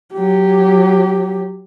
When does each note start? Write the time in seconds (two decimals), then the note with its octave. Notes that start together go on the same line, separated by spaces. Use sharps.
0.15 F#3 G4